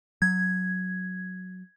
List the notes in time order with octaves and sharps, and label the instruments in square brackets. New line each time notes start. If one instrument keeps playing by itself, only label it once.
[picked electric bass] F#3 [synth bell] G#6